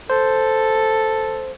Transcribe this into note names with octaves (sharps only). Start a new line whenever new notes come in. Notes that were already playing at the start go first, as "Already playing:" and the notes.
A4 C5